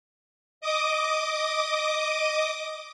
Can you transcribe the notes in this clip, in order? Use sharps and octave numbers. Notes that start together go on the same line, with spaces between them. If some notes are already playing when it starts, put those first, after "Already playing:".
D#5 D6 D#6